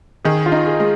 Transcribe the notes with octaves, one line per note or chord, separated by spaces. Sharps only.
D#3 G#4
F4
D#4
G#4
G#3